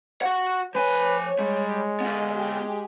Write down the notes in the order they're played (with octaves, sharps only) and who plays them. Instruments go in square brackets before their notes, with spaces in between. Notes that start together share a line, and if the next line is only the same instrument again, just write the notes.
[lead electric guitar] F#4 F#5
[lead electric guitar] F3 G#5 [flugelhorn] B4 [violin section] C#5
[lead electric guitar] G3 [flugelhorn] G#3
[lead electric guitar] B3 F4 [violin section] D#5
[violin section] G4 G#4